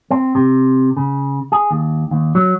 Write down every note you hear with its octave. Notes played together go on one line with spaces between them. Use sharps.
C4
C3
C#3
G#4
D#2
D#2
F#3